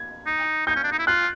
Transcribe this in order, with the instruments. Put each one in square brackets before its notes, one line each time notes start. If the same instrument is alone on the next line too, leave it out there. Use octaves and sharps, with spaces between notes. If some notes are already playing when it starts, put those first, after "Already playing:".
Already playing: [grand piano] G#6
[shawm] D#4
[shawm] D#4 [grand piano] G6
[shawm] C#4
D4
D#4
E4
[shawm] F4 [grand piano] F#6